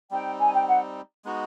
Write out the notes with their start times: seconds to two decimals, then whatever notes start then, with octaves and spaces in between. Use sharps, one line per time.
0.11 G3 C4 D#4 G5
0.39 G#5
0.53 G5
0.68 F#5
1.25 G#3 B3 D#4 F#4